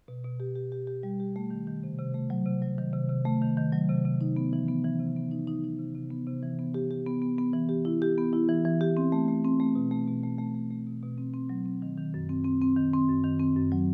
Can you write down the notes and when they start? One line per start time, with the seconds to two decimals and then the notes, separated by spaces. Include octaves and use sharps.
0.08 B2
0.24 B2
0.40 G4
0.56 G4
0.72 G4
0.87 G4
1.03 G3
1.20 G4
1.36 A3
1.51 D#3
1.67 D#3
1.83 C3
1.99 C3
2.14 A3
2.30 F#3
2.46 C3
2.62 F#3
2.78 D#3
2.93 C3
3.09 C3
3.26 A3
3.42 D#3
3.57 D#3
3.73 F#3
3.89 C3
4.05 C3
4.21 D#4
4.37 B3
4.53 E3
4.68 B3
4.85 E3
5.00 C3
5.16 B3
5.31 D#4
5.47 D#4
5.64 D#4
5.79 C3
5.95 C3
6.10 B3
6.27 C3
6.43 E3
6.59 B3
6.74 G4
6.91 G4
7.07 B3
7.22 B3
7.38 B3
7.53 E3
7.69 G4
7.85 E4
8.02 G4
8.18 B3
8.33 E4
8.49 E3
8.65 E3
8.81 G4
8.97 C4
9.12 A3
9.28 A3
9.45 C4
9.60 A3
9.75 B2
9.91 A3
10.07 B2
10.24 A3
10.38 A3
10.55 A3
10.71 A3
10.87 B2
11.03 B2
11.18 C4
11.34 C4
11.49 F#3
11.66 C4
11.82 D#3
11.97 D#3
12.14 F#2
12.29 C4
12.45 C4
12.62 C4
12.77 D#3
12.93 C4
13.09 F#2
13.24 D#3
13.40 C4
13.56 F#2
13.72 F#3